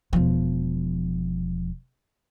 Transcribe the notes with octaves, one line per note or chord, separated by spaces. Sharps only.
E1 F3